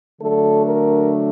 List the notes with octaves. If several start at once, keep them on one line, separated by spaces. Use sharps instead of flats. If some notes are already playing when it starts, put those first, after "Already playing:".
D3 F#3 A3 D4 A4
A#4